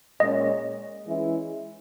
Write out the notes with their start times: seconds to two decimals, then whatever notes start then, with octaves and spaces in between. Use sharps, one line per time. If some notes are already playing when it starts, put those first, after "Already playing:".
0.20 A#2 G#3 C#4 D#5
1.05 E3 G#3 C#4 E4